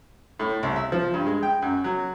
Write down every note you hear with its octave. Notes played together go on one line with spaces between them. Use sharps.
A2
C2
E5
F3
G2
G#3
G5
F#2
F#3